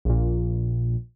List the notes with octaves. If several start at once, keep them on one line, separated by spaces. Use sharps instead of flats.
A#1 A#2